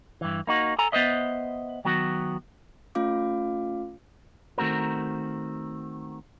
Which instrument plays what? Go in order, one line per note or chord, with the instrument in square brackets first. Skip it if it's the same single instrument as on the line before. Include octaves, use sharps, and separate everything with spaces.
[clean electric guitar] G2 E3
A#3 D#4 F#4
A4 G#5 A#5
B3 B4 C5 D#5 E5
D#3 F#3 B3 F#4
[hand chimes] A3 C#4 F4 F5 D6
[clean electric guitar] D#3 A3 C4 F#4 A#4